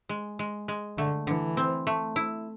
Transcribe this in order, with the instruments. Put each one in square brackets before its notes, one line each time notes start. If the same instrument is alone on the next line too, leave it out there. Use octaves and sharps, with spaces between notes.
[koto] G#3
G#3
G#3
[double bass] D3 [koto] A3
[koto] D3 [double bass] E3
[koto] C4
A3
E4